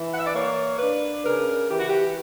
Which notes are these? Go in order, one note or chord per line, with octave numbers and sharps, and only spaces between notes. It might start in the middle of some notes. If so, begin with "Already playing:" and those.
Already playing: E3
F#5
E5
D5
A#3 C#5
D4 B4
C#3 A#4
E3 G4
F#4
G4